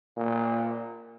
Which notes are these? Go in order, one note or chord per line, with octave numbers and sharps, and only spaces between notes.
A#2